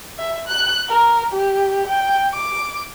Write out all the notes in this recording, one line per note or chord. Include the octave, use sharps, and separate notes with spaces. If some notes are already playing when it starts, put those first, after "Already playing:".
E5
F#6
A#4
G4
G5
D6